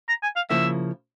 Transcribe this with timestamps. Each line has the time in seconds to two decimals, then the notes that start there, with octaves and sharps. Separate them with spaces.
0.09 A#5
0.23 G#5
0.36 F5
0.50 C#3 F3 A#3 E4 E5